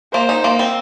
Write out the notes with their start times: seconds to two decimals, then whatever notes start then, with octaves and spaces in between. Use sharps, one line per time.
0.13 A#3 C5
0.29 D#4
0.44 A#3
0.59 C4